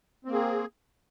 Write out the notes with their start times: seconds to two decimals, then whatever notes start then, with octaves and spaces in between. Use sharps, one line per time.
0.25 C4
0.29 A#3
0.33 G#4